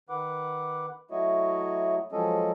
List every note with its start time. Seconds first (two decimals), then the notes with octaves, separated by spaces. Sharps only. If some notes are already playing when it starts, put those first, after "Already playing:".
0.09 D#3 B4 F#5 D6
1.11 F#3 A3 E4 F#4 C#5 D#5
2.12 F3 F#3 G#3 C#4 A4 D#5